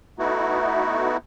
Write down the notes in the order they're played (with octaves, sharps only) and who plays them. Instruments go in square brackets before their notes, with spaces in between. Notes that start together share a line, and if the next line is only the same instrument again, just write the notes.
[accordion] A3 B3 D#4 E4 F#4